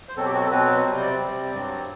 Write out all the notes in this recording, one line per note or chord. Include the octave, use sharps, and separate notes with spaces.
C5
B2 F#3 C4 A4
G4
F#4
A4
B2 F#3 C4 B4
C3 G3 C4 C5
C5
D5
C3 G3 C4
G2 F#3 C4